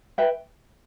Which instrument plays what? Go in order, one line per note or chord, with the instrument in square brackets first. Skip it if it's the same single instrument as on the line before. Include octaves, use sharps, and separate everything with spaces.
[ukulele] B4 E5 G5